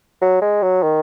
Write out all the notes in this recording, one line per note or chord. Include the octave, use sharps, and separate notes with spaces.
F#3
G#3
F#3
D#3